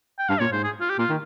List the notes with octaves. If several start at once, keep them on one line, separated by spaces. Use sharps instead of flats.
G5
G2 F5
A#2 C#5
G#2 C5
G#4
F4
G4
A#2 F4
D#3